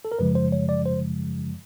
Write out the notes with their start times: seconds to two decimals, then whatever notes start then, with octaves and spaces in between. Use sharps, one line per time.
0.05 A4
0.12 A#4
0.19 F#2 C#3 F3 G#3 B4
0.35 C5
0.52 C#5
0.69 D5
0.86 C5